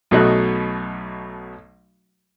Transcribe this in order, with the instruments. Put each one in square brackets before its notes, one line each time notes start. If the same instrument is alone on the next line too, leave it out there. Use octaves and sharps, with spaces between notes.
[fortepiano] B1 B2 F#3 A3 D#5 F#6